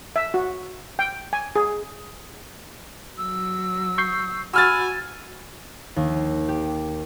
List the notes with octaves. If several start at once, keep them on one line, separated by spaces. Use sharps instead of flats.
E5
F#4
G5
G#5
G#4
F#3 E6
C#6 G6 C7
F#4 G#5 B5 E6 F6 A6
D#2
G4